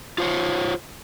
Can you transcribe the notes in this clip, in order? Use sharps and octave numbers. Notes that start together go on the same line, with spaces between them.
F4 C5 C#5